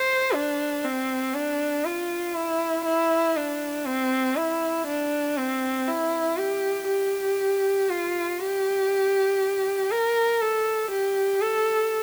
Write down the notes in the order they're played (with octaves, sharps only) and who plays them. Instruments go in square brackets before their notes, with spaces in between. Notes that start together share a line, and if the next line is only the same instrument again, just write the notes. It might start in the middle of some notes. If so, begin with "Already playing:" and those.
Already playing: [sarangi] C5
D4
C4
D4
F4
E4
E4
D4
C4
E4
D4
C4
E4
G4
G4
F4
G4
A#4
A4
G4
A4